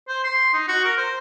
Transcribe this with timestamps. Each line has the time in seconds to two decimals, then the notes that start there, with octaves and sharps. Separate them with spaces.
0.08 C5
0.24 C6
0.53 D#4
0.68 F#4
0.84 A#4
0.97 C5